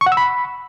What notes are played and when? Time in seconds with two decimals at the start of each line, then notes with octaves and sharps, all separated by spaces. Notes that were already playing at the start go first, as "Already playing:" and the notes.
0.01 C#6
0.06 F#5
0.12 E6
0.17 B5